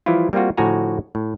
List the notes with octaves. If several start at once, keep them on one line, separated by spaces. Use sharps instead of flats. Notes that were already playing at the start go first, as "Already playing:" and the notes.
E3 F3 G3 E4 F4
G3 A#3 C4 F4 F#4
A2 D3 F3 F#4 G#5 A#5
A2